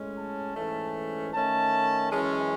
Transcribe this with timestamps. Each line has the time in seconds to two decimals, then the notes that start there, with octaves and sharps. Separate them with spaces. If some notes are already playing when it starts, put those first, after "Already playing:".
Already playing: A2 G#3 C#4
0.16 A5
0.55 G#2 E3 A3 C#4
1.33 D#3 A3 C#4 A5
2.11 F#2 E3 G#3 C#4